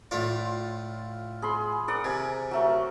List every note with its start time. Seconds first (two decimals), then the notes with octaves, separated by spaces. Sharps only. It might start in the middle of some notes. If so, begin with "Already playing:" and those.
0.11 A2 F4 C#5 D5
1.42 G#4 B5 C6
1.88 A#4 D5 F#5
2.05 C3 G#5
2.51 F#3 A3 A#4